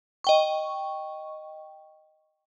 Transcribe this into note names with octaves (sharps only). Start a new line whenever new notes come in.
D#5 G5 C#6